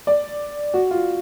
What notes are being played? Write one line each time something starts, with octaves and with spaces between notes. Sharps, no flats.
D5
F#4
F4